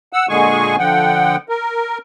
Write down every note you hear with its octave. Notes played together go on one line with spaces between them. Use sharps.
F#5 E6
A#2 D3 G#3 G#4 G#5 C#6
D3 F3 F#5 G5
A#4